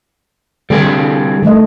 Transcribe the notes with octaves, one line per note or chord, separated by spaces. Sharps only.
D3 G3 C4 G#4
D#3 A3 D#5